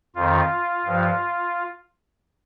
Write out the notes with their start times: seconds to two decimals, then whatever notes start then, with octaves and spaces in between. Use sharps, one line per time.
0.16 F2 D#3 F4
0.85 G2 F3